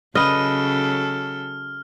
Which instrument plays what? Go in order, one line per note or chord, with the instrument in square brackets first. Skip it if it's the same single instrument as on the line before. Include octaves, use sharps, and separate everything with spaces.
[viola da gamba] C#3 F#3 A4 [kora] B4 D#5 [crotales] F6